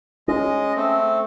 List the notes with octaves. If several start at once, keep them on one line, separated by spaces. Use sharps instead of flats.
G#3 C#4 D#5
A3 C4